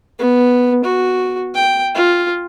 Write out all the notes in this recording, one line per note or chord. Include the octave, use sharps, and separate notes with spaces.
B3
F#4
G5
F4